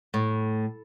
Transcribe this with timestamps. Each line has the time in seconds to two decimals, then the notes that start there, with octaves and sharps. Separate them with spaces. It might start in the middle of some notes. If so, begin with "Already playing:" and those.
0.14 A2